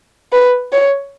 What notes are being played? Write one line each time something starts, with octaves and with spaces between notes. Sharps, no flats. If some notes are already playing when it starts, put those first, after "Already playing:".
B4
C#5